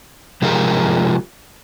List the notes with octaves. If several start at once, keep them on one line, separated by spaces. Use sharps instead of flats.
C3 F3 G#3 F4 G4 A#4